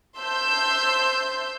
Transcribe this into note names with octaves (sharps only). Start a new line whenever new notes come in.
C5 E5 A5 C6 E6 G6